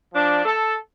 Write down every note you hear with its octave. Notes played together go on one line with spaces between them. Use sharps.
F3 D4
A4